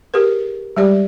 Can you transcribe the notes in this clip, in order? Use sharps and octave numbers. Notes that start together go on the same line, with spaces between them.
G4 G#4 A#4 B4
G3 G#3 G4 D5